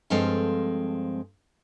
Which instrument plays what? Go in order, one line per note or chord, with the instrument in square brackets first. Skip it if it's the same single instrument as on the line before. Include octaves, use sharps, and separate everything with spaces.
[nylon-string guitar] G2 F3 G#3 C4 A4 F5